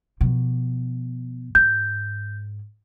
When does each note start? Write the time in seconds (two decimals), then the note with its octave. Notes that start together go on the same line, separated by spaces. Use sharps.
0.21 B2 F3
1.55 G#2 G6